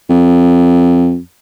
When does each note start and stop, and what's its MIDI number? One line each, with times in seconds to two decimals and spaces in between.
0.09 1.18 41